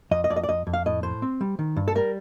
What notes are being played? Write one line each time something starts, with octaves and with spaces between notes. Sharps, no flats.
F2 D#5
D#5
F2 D5
D#5
D5
F2 D#5
F2
F5
A2 D#5
A2 C5
C4
G3
D#3
G2
A4
G3 A#4